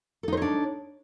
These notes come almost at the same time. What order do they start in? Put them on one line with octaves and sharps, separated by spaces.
A4 D#4 C5 C#5 D4